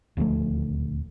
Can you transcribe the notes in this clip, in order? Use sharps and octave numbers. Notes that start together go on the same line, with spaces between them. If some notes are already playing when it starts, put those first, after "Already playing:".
D#1 D2 F3 A3